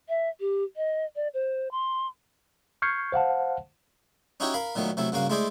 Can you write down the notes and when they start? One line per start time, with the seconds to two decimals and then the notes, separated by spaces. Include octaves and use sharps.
0.09 E5
0.40 G4
0.76 D#5
1.16 D5
1.34 C5
1.71 C6
2.82 C#6 F6 G6 G#6 C7 C#7
3.12 C5 F5 F#5 A5
4.40 C#4 D#4 E4 F#4 G4 C#5
4.54 A#4 F5 B5
4.75 A#2 D#3 F#3 A3 B3
4.97 C3 F#3 A3 E4
5.12 G2 C#3 A#3 F#4 F5
5.30 G#3 A3 E4 G#4 C5 D5